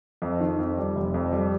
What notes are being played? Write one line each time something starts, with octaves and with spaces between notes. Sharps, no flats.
F2 F3
D#3
F2
G3
F1 F3
F2
F3 G3